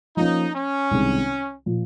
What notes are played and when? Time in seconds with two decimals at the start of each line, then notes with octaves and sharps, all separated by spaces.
0.17 F3 A#3 C#4 D#4
0.54 C#4
0.91 C2 C3 D#3 G#3
1.66 A#2 F3